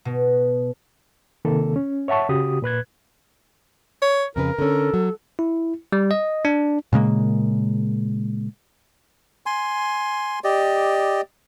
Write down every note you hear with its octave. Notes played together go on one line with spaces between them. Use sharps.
B2
C3 D#3 A#3 A4
C#4
C#5 E5 F#5 A5 C#6
C#3 F#4 G4 D#6
A#2 B4 F#6 G#6
C#5
F2 C#3 A#4 B4
D3 C#4 A4
F#3
E4
G3
D#5
D4
A#2 C#3 G#3 A#3
G#5 C6
G4 D5 D#5